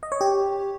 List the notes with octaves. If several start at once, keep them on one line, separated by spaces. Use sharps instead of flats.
D#5
C#5
G4